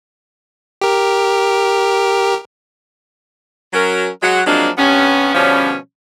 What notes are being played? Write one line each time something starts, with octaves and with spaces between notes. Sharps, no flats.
G4 A#4
F#3 C#4 A#4
F#3 G#3 F#5
F3 F#3 G#3 A#3 C4 D4
G2 C3 B3 C#4
B2 D3 F3 G3 C#4